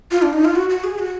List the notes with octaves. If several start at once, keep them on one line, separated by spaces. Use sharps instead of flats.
F4
D4
D#4
F4
F#4
F#4
G#4
F#4